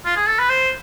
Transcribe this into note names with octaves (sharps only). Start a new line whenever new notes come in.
F4
G#4
A4
B4
C5